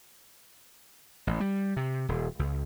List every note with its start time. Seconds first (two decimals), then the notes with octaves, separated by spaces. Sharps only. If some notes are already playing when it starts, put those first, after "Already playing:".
1.27 A1
1.40 G3
1.77 C3
2.09 D#1
2.39 C#2